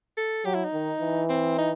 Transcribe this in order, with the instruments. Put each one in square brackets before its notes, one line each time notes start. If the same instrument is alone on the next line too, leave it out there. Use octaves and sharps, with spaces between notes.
[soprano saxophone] A4
[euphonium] F#3 [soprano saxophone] G4
[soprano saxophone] E4
D#4
[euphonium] D#3
E3
[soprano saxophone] C4
D#4